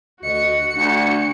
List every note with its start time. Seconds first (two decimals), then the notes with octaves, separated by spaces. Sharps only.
0.23 D2 F#4 D#5 C#7
0.77 D2 D4